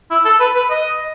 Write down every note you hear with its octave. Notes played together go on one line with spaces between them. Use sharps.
E4
A4
B4
B4
D#5